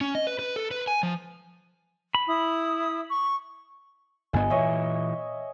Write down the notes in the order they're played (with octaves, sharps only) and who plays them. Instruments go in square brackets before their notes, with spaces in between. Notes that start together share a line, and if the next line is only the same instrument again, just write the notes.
[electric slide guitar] C#4
D#5
B4
B4
A4
B4
G#5
F3
[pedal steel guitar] B5
[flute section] E4 D#6
C#6
[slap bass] G1 G2 B3 [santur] D#5 G#5
[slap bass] A#2 E3 [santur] C#5 D#5 E5